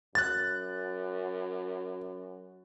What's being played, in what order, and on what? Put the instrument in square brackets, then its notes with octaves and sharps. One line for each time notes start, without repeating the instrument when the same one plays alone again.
[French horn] F#2 [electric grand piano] F#6 A6